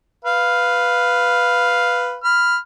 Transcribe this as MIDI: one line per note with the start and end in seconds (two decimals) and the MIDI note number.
0.25 2.18 71
0.25 2.18 77
2.24 2.57 83
2.24 2.57 89